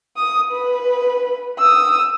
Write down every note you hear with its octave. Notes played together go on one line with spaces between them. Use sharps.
D#6
B4
D#6 E6